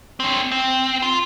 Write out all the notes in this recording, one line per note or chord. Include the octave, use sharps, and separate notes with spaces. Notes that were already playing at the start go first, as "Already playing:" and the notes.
C4 C#5
C4
F4